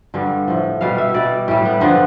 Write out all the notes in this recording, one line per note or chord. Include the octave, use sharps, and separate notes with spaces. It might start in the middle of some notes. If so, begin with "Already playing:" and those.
G2 D3 G3
A2 F3
B2 G3 F5
E5
B2 G3 D5
A2 G3 G4
B3
G2 D3 F3 B3